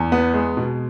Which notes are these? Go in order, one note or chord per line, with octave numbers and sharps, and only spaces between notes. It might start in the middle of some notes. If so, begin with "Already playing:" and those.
Already playing: E2
B3
G#3
B2